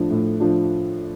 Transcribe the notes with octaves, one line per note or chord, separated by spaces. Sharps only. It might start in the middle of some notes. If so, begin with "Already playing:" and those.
Already playing: A2 F3 D4
A2
F3 D4